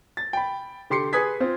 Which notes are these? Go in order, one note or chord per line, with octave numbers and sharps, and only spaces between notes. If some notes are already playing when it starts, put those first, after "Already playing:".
A6
G5 B5
D3 G4 C6 C7 C#7
G#4 B4 G#5 D#6 G#6 B6
C4 F4 C5